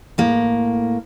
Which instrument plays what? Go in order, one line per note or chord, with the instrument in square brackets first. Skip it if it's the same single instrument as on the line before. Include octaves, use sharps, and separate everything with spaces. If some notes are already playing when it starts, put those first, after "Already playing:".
[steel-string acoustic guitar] A2 A#3